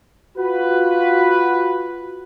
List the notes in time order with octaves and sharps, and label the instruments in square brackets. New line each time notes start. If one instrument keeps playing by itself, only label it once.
[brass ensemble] F4 F#4 B4